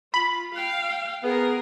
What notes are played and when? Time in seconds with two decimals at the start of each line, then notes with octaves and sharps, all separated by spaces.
0.14 F4 B5
0.55 F5 G5
1.24 B3 G#4 A#4